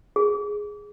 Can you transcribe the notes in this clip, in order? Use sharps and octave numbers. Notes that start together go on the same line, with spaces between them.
G#4